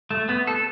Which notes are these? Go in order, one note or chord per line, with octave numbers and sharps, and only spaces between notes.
A3
B3
A4